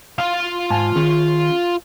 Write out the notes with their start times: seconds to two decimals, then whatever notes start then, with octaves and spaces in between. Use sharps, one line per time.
0.19 F4 F5
0.70 G#2 G#5 A5
0.96 D#3 C#4 G#4